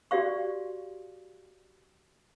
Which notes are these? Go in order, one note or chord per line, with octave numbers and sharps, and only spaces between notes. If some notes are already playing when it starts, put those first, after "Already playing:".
F#4 G4 D5 F5 C#6